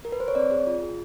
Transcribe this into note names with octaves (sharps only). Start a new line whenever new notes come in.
A#4
B4
C5
C#5
C4 D5
G#4
F4
G#4